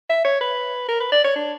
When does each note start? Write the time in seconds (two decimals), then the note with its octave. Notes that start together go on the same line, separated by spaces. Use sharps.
0.09 E5
0.24 C#5
0.41 B4
0.88 A#4
1.00 B4
1.12 D5
1.24 C#5
1.36 D4